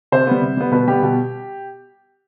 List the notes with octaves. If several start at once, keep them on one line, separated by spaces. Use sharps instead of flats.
C3 C5
G3 B3
C3
G3 B3
B2 B4
G3 B3 G4
B2